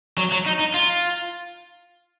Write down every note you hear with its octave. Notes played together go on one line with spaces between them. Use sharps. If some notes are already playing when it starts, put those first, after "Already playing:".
F#3
F#3
D#4
D#4
F4